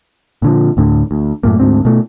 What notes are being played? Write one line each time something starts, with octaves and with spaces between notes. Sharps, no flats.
A#2 D3 F3
D2 A2 D3
D2
F#2 A2 A#3
D2 G#2 C4
B2 A3